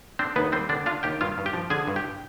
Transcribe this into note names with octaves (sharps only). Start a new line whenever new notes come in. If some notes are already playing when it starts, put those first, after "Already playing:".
C4 D4 C5
D#2 B3 B4
G3 C4 C5
D3 D4 D5
D4 F4 F5
D#2 G4 G5
G2 F4 F5
G2
G4 G5
F3
D3 G#4 G#5
G2
G4 G5